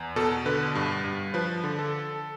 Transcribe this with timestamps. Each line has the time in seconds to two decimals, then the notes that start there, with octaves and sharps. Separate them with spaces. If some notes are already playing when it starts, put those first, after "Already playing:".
Already playing: E2
0.16 B2 A4
0.46 D3 B4
0.75 G2
1.04 G2
1.34 F3 B4
1.64 D3
1.79 A4